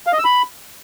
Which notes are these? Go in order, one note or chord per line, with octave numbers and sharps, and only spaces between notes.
F5
D#5
E6
B5